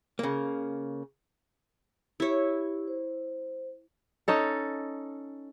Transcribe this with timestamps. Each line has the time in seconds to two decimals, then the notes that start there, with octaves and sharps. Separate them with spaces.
0.19 C#3 A#3
2.20 E4 G4 C#5
2.87 C5
4.28 C#4 D#4 A4